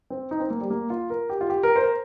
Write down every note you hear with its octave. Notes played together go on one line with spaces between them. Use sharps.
C4
D#4
C4
A#3
G3
A#3
F4
A#4
G4
F4
G4
A#4
C5
A#4